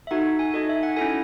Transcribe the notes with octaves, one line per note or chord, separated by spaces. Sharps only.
E5
D#4 F#4 A4 F#5
G#5
D#4 F#4 A4 D#5
E5
F#5
C#4 E4 A4 G#5